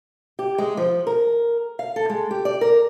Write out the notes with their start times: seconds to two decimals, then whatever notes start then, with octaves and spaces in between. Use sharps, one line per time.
0.39 G4
0.58 G#3
0.77 F3
1.07 A#4
1.79 F5
1.96 A4
2.10 G#3
2.31 G4
2.45 D5
2.61 A#4